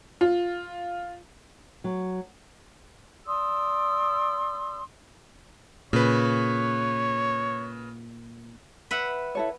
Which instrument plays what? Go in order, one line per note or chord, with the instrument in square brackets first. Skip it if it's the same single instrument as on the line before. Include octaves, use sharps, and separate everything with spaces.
[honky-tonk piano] F4
[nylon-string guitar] F#3
[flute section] D5 C6 D#6 E6
[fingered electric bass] A#2 [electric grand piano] C#3 B4 [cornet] C#5
[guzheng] B4 E5 F#5
[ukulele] E4 A4 C#5